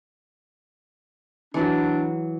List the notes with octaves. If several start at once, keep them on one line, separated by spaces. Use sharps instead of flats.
E3 F#3 D4